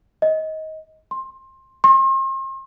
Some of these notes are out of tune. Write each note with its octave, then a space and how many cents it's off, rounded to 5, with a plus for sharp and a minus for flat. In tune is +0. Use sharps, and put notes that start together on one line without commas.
D#5 +20
C6 +20
C6 +40